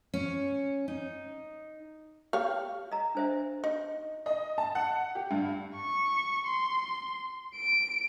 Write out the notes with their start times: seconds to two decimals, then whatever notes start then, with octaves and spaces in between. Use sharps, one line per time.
0.14 C#4
0.88 D#4
2.33 G4 C#5 F5
2.92 D#5 A#5
3.15 D4 C5 E5
3.64 D#4
4.26 D#5
4.58 A5
4.75 F#5
5.15 G4
5.31 G2
5.75 C#6
6.47 C6
7.56 D7